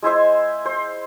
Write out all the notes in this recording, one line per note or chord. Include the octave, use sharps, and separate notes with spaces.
G#3 E4 C5 E5
C5